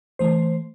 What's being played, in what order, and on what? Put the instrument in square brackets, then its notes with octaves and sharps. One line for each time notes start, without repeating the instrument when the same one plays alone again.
[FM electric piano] E3 A3 C5